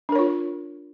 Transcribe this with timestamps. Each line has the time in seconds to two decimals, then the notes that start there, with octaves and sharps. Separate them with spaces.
0.09 D4
0.12 A#4
0.15 C#5
0.19 F4